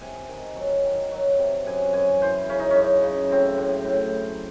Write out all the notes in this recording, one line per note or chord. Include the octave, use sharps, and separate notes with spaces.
C3 G#5
D#3
F#3
D#3
F#3
C3
F#2 G#5
F#2 G#5
E3 C5
C#3 C#4
D#4
C#4
F#2
C#3
A2 C4
A2
A2